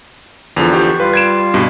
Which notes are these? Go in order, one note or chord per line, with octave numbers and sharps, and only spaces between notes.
E2 D3 F3 F7
G4 C#6
G3 F4 B4 F5
G#6 D7 E7
G2 B2